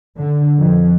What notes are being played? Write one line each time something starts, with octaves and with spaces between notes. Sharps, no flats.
D3
F2